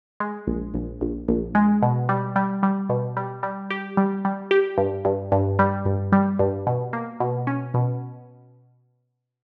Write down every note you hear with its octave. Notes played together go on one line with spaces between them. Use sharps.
G#3
A#1
A#1
A#1
A#1
G#3
B2
G3
G3
G3
B2
G3
G3
G4
G3
G3
G4
G2
G2
G2
G3
G2
G3
G2
B2
A#3
B2
C#4
B2